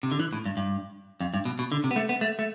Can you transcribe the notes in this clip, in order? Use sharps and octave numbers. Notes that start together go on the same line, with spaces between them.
C3
D3
E3
A2
G2
G2
F2
G2
B2
B2
D3
C3
B3
A3
B3
A3
A3